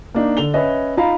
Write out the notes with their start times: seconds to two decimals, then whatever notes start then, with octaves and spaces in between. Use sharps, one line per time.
0.14 A#3 D4 D#4
0.37 D3 F7 G7
0.54 C#4 B4 C#5 D#5 E5
0.97 D#4 F4 F5 A#5 B5